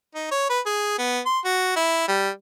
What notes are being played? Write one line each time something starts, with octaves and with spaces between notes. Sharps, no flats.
D#4
C#5
B4
G#4
B3
C6
F#4
E4
G3